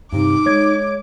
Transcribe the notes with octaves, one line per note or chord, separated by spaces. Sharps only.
G2 C3 D#4 D6
G#3 C#5 G#6